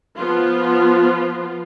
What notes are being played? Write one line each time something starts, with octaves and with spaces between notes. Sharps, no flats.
F3 B3 F4